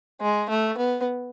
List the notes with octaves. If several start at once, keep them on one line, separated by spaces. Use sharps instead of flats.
G#3
A3
B3